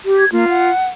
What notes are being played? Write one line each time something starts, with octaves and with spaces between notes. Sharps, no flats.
G4
G#6
A#3 F4
F#5